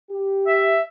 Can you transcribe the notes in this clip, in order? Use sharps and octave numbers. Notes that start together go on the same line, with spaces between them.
G4
E5